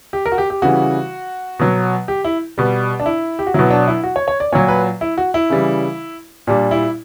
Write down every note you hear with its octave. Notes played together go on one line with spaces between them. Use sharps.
G4
A#4
F#4
G4
G4
C#3 E3 G3 F#4
B2 F#3
G4
E4
B2 G3
D4
E4
G4
F#4
B2 F#3 E4
D4
E4
F#4
C#5
C#5
D5
A#2 F#3 C#5
B4
E4
F#4
E4
C#3 E3 G3
A#2 G3 D4
E4